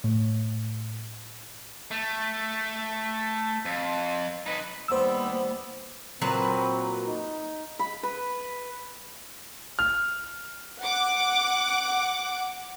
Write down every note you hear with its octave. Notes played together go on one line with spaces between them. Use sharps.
A2
A3
F2
D#4 B4
D#2 G3 B3 C5 E6
A#2 F#3 C4 B4
D#4
B5
B4
F6
F#5 D6